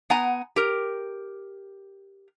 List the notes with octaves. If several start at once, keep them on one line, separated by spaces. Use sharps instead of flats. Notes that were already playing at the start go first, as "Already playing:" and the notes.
B3 F#5 G#5 A#5
G4 A#4